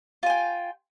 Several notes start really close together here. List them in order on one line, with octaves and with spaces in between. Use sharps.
F4 G#5 G5